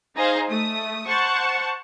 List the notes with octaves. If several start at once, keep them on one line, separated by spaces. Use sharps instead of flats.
D#4 G#4 C5 F5
A3 D#6
C5 F#5 A5 C#6